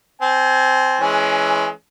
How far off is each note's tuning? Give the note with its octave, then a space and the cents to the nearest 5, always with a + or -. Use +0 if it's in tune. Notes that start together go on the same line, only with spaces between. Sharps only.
C4 +0 G#5 +40
E3 +0 G#3 +25 C#4 +0